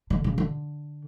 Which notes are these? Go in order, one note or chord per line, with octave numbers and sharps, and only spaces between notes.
D3
C#3
D3